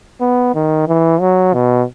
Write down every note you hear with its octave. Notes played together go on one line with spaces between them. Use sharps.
B3
D#3
E3
F#3
B2